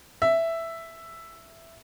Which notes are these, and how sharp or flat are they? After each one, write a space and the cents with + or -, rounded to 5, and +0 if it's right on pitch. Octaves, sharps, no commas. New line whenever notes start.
E5 +5